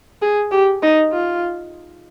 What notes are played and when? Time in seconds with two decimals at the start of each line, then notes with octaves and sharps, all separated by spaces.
0.22 G#4
0.52 G4
0.83 D#4
1.12 F4